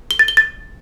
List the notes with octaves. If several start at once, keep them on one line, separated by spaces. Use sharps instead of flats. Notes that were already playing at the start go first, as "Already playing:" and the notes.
G7
A6
G7
A6